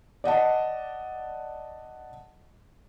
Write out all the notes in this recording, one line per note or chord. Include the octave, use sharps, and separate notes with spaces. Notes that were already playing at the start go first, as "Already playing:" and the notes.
D5 D#5 F#5 A5